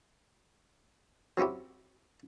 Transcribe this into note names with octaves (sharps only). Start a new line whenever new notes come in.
F#3 C4 C#4 E4 G4